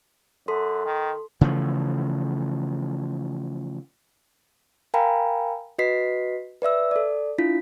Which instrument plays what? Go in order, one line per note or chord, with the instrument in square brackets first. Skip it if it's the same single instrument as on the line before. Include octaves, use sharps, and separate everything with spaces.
[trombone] F#2 [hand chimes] A4 C6
[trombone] D#3
[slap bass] C#3 E3 F3 A3
[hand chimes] A#4 F5 G5 G#5 A#5 B5
F#4 B4 D#5 B6 C7
B4 D5 E5 E6
A4 D5
D4 E4 F4 B6